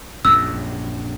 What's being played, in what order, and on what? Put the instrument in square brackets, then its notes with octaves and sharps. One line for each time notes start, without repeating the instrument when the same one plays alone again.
[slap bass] A#1 F#2 [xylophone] E6